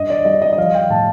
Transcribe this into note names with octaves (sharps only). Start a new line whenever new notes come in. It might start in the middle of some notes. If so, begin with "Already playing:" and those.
Already playing: G2 D#5
D5
G3 D#5
D#5
D#5
F3 F5
G5
A2 A5